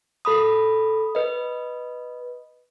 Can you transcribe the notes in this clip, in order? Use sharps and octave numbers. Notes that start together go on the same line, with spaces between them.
A4 B5 D#6
B4 D#5